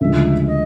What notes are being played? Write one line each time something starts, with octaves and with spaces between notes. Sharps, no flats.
D2 C#3 F3 G#3 E5
D#5